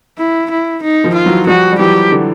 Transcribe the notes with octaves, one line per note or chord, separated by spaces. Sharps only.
E4
E4
D#4
D#3 F3
F4
E3 F#3
F3 G3 F#4
G3
E3 F#3 G4
D3